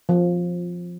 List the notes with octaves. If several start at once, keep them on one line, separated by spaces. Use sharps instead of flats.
F3